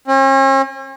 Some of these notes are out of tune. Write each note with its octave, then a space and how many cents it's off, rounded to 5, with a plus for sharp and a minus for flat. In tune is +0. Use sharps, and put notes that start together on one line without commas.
C#4 -45